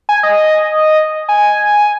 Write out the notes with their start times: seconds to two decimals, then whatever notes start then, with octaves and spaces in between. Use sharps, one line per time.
0.09 G#5
0.23 D#5
1.29 G#5